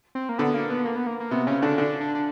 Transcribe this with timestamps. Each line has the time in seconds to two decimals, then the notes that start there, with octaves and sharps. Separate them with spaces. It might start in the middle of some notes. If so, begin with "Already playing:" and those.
0.15 C4
0.29 A#3
0.38 D3 B3
0.54 A#3
0.70 B3
0.85 A#3
0.96 B3
1.07 A#3
1.20 A#3
1.31 C3 B3
1.47 C#3 C#4
1.62 D3 D4
1.78 D3 D4
2.01 D4
2.15 D4